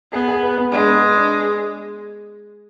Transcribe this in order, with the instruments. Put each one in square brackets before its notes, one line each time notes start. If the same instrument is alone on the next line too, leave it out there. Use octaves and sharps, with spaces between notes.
[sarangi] B3 [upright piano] G#4
[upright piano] G#4
B4
B3
[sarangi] G#3 [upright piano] D4
[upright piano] B3
B4
D4